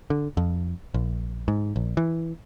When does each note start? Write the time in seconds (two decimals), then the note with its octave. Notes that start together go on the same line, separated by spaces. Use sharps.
0.10 D3
0.37 F2
0.94 A#1
1.48 G#2
1.76 A#1
1.97 E3